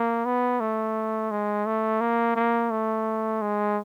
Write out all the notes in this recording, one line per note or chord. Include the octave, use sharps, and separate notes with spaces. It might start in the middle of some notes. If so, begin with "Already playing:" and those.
Already playing: A#3
B3
A3
G#3
A3
A#3
A#3
A3
G#3